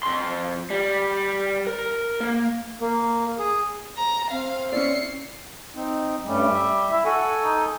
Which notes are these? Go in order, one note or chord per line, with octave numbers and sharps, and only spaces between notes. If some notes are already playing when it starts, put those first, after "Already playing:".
F2 C6
G3
A#4
A#3
A#3
G#4
A#5
C4 F5
C#4 E4 D5 C7 C#7
C4 D#4
G2 G3 A3 C#4
E5
E4
F#4 A4 G#5
D#4